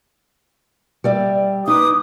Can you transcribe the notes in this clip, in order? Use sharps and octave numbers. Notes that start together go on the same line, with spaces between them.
G3 D5 E5
D#4 B4 D6 D#6